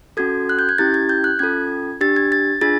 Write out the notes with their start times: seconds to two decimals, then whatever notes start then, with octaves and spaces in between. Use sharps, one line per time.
0.17 C#4 F#4 A4 G#6
0.49 F#6
0.59 G6
0.69 G#6
0.78 C#4 E4 G4 A6
0.94 G#6
1.09 G6
1.24 F#6
1.39 C#4 F4 A4 G#6
2.01 D4 G4 A6
2.16 G#6
2.32 A6
2.61 D4 F4 G#4 A6